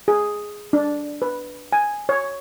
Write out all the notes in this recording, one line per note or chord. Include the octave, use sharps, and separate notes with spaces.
G#4
D4
B4
G#5
C#5